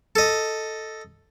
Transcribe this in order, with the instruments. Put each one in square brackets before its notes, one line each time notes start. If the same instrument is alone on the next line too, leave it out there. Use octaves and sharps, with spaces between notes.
[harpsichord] A4 D#5